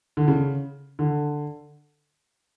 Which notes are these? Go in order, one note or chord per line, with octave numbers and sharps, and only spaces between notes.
D3
C#3
D3